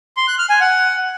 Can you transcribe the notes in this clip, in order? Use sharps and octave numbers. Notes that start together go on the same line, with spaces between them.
C6
F#6
F6
G#5
F#5